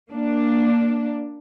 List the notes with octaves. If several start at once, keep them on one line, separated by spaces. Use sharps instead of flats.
A#3 D4